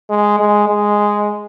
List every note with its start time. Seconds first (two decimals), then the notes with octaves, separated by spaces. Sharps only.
0.09 G#3
0.39 G#3
0.68 G#3